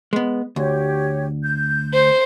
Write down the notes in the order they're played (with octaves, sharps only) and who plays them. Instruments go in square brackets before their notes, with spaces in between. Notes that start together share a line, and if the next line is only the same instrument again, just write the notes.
[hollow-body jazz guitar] G#3 B3
[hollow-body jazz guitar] D2 [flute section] G4 C#5
[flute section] G6
[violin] C5